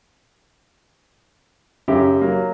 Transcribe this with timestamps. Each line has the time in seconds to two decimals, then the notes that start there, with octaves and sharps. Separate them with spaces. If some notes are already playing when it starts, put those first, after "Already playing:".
1.88 F#2 C#3 G4 E5
2.21 F#3 A#3